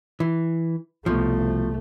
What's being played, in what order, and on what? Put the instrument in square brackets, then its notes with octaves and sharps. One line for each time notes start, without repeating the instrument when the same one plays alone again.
[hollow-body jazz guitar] E3
[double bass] C2 A3 [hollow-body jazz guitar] B2 F3